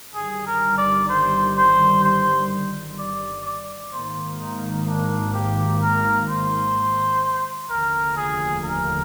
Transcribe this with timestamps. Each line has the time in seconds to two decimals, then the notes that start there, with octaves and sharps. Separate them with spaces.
0.15 G1 G2 D#3 G3 G#4
0.47 A#4
0.78 D5
1.09 C5
1.57 C5
2.04 C5
2.99 D5
3.45 D5
3.92 G#1 G#2 D#3 A#3 C5
4.39 D#4
4.86 D4
5.34 G4
5.81 A#4
6.28 C5
7.70 F1 D#2 D3 F3 A#3 A#4
8.16 G#4
8.64 A#4